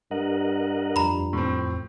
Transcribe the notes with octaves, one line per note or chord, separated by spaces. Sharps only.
G2 A#4 D#5 F#5
F2 A#5 B5
A2 C4